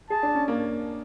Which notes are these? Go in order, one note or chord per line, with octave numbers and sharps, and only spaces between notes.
G#4 A5
D4
C#4
A#3